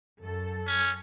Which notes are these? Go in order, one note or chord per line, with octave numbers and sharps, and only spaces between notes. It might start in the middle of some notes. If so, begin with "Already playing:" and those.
F#2 A4
C#4